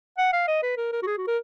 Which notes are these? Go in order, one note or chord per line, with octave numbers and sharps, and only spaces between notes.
F#5
F5
D#5
B4
A#4
A#4
F#4
G#4
F#4
A#4